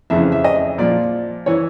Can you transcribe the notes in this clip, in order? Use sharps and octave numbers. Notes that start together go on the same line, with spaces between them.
F2 C#3 E3 E5
E5
D#5
A#2 F3 D5
E3 C#5